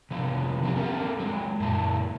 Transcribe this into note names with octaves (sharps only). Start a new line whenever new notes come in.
C3 F3 B3
F3 C4 C#4 G4
A3 C4 A4 A#4
F#3 G#3
F#2 A#2 A5